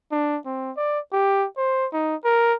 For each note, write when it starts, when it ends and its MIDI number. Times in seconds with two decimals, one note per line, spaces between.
0.12 0.38 62
0.46 0.71 60
0.77 1.00 74
1.13 1.46 67
1.57 1.87 72
1.93 2.16 63
2.24 2.54 70